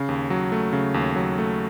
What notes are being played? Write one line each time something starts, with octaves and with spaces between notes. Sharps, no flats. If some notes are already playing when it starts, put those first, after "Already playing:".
Already playing: C#3
D#2
F#3
A3
C#3
D#2
F#3
A3